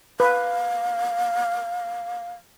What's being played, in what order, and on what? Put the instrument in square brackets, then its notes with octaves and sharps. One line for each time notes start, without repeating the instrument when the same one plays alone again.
[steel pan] B4 [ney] F5